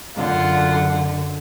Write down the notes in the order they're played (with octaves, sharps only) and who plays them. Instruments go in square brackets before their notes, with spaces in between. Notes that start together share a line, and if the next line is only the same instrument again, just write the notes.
[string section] F#2 D3 [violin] F4 F#5